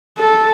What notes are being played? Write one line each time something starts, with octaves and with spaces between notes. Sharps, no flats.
A4